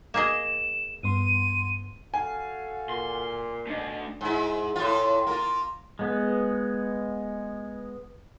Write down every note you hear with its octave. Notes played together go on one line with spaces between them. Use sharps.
A#3 G#4 D#5 E7
G2 B3 C6 D#7
F#4 A4 F5 G#5
A#2 C6
B2 A3 D4
G#2 E4
A2 F4
A#3 F4
G#3 B3